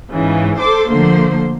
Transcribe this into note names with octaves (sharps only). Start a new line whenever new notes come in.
G#2 C#3 E3
A4 C5 D6
D3 F3 A3 A#3 C5